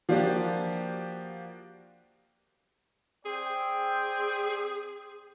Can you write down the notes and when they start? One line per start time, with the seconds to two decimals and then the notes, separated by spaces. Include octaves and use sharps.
0.09 F3 A#3 D4 F#4 G4
3.26 C4 G#4 D5 G5